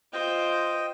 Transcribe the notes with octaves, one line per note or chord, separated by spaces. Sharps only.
F4 C5 D#5 G5